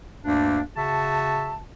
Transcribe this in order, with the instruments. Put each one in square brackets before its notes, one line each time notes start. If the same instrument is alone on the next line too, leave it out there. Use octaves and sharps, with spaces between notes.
[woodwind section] D2 G2 A#3 D4
C#3 F#4 E5 A5